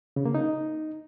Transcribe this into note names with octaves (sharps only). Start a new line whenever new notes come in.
C#3
A#3
D#4